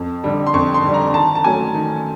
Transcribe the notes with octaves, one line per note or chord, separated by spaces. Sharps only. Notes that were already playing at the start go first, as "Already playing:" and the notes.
Already playing: F2
D3 G3
C6
F2 C#6
C6
D3 G3
A#5
D#3 A5
A5
F#3 A3 C#4 G#5
D#3